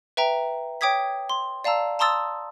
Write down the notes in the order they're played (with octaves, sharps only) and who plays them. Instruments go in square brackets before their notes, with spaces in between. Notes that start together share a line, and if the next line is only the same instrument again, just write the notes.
[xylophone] B4 E5 G5 A#5
C#5 G5 D6 D#6 G#6 B6
C6
D5 F5 A5 A#5 E6
A5 A#5 C6 D#6 E6 A6